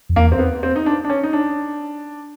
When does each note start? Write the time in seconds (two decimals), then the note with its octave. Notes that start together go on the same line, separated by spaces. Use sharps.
0.09 F2
0.16 E2 A#3
0.32 C4
0.39 B3
0.63 C4
0.76 D#4
0.86 D4
1.05 D4
1.10 C#4
1.23 D#4
1.33 D4